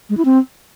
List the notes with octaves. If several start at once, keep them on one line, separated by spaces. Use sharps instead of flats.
G#3
E4
C4